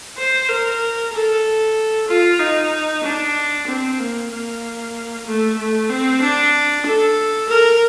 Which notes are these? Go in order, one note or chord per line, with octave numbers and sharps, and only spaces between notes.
C5
A#4
A4
F4
D#4
D4
C4
A#3
A#3
A3
A3
C4
D4
A4
A#4